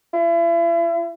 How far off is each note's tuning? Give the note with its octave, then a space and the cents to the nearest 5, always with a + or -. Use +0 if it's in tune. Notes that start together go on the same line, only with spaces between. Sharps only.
E4 +40